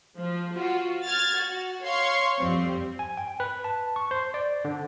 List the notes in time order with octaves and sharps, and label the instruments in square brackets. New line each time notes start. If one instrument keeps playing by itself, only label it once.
[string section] F3
F4 F#4
F6 G#6 A6
F#4
C#5 F5 C6 C#6
F2 G3 C4
[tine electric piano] G#5
G5
B4
A5
C#6
C5
D5
D3